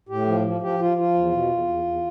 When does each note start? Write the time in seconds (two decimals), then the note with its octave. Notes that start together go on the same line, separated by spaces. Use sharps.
0.09 A2 G4
0.27 F3
0.44 F3
0.61 F3 G4
0.79 F3 F4
0.97 F3 F4
1.14 E2
1.32 B2
1.50 E2
1.67 E2
1.84 E2